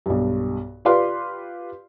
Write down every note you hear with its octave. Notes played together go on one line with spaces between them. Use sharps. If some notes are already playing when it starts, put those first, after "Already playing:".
B1 G2
F4 G4 B4 D5 F5 C6